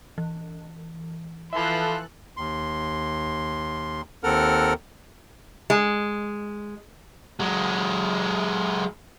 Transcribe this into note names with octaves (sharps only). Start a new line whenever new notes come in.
E3
E3 F3 A4 E5 B5 C6 F#6
D#2 C6
D#2 C4 A4 A#4 F#5 F6
G#3
F#3 G#3